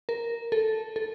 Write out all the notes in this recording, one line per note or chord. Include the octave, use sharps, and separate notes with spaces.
A#4
A4
A4